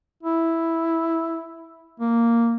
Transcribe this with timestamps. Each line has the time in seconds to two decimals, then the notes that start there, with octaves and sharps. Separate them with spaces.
0.23 E4
2.00 A#3